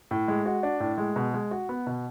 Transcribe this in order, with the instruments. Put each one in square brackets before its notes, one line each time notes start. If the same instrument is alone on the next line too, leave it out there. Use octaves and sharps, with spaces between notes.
[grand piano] A2
G#3
F#4
D4
A2
G#3
B2
G#3
F#4
B3
B2